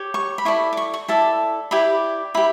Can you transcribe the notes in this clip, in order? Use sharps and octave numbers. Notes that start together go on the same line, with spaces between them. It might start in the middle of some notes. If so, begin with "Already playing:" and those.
Already playing: G4 C#5
C#6
B5
E4 A4 D5 C#6
D6
C#6
C#6
E4 A4 D5 A5
E4 G4 D5 B5
E4 G4 B5